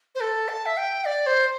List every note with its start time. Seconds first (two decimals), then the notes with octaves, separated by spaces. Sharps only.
0.15 C5
0.21 A4
0.49 A5
0.66 E5
0.77 G5
1.05 D5
1.26 C5